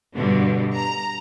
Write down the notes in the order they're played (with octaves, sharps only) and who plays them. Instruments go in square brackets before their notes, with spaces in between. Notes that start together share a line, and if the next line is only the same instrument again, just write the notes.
[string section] G2 B2 D3
A#5